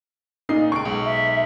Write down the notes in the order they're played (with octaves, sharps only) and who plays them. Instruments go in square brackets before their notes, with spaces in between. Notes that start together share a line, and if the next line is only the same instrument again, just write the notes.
[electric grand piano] A#2 C7 [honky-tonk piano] D#4
[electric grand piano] C#2 D7 [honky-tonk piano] C#6
[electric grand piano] B1 G#3 D7
[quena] E5